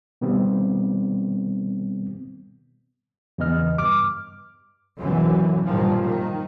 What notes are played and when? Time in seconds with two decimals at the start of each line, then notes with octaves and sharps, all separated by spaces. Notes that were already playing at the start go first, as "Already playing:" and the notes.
0.21 B2 D#3 G3 B3 C4
3.38 E2 C#3 E3 B3 D#5 F6
3.78 G2 D6 F6
4.99 F#2 B2 D3 E3
5.66 G2 A#2 D#3 F3
5.99 D#3